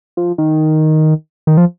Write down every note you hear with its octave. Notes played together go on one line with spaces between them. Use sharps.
F3
D#3
D#3
F3